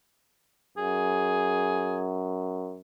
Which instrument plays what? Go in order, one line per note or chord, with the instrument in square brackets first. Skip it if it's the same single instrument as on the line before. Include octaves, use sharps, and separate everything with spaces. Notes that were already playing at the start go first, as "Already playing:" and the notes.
[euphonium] F#2 [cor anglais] G#4